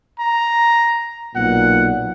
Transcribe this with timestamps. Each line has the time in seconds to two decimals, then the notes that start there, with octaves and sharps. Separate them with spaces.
0.20 A#5
1.36 B1 A#2 F#5